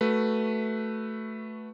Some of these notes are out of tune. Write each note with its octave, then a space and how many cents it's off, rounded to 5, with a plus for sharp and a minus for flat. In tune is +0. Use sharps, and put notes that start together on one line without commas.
A3 +0 F#4 +0 B4 +0